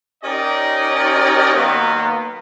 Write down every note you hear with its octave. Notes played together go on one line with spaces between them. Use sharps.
C#4 D#4 G4 A#4 D5 D#5
D#3 F#3 A#3 B3